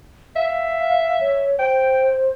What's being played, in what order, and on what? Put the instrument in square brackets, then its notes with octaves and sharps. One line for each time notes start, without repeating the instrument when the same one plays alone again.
[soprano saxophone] E5 [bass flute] F5
[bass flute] C#5
[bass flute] C5 [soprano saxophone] G5